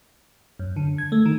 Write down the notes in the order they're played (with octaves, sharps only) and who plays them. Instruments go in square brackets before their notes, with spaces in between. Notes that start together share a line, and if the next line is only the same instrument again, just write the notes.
[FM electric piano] F#2
D3
G#6
A3
D#3